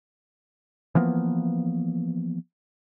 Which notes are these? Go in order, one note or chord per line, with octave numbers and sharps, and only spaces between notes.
E3 F3 A#3 B3